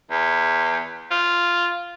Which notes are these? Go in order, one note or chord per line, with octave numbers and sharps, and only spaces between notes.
E2
F4